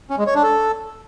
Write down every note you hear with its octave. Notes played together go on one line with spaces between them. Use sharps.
C#4
G#3
C#5
D4
A4